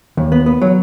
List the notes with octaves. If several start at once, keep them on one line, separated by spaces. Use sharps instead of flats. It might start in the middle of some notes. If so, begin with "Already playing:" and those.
D#2
B3
B3
F#3